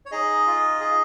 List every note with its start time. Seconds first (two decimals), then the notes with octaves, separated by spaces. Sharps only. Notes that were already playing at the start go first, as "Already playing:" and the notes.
0.06 C#5
0.11 D#4 G#4 D#5
0.46 F4
0.80 G#4